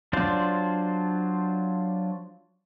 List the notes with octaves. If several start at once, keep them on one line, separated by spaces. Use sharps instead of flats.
F#3 D4 F4 C5 D5